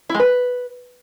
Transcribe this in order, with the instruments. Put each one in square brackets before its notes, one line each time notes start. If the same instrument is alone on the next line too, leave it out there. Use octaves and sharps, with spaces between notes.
[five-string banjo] E4
G#3
B4